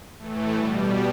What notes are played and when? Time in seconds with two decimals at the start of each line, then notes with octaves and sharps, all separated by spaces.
0.19 A2 E3 A3
0.54 B2 G3